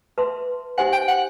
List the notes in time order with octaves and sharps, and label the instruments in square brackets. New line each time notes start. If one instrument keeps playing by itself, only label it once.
[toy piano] B4 E5 A5 C6
[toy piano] D#4 G4 C5 E5 G#5 [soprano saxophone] F#5
[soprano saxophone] G5
F#5